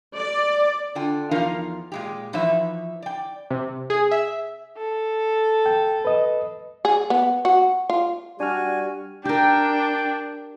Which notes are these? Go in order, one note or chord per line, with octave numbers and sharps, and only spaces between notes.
D5
D3 D4 F4 G5
E2 F3 D#4 F4 A#4 F5
A#2 G#3 G4
E3 F3 D#4 B4 C#5 E5
D5 G5
C3
G#4
E5
A4
G5
B4 D#5
G#4
B3
F#4
F4
G3 D4 F#4 G#5 F6
D4 G4 A#4 G5